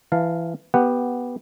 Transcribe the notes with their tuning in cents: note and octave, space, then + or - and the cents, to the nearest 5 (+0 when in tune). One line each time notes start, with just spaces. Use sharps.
E3 +20 F5 +0 A5 +15
B3 -5 G4 +0 F#5 +0